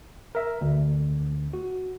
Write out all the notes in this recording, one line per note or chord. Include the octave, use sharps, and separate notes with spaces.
A#4 E5
D2
F#4